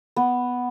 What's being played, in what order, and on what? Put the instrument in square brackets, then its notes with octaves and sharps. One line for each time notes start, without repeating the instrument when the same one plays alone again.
[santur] B3